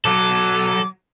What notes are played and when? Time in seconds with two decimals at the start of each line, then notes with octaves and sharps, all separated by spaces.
0.05 B1 F#3 A4 D6